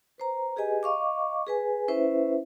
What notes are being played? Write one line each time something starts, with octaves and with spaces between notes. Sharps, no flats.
B4 C5 A#5
G4 G#4 B4 D#5 G#5
D#5 F5 C#6 D6
G#4 B4 G#5
C#4 E4 B4 C5 E5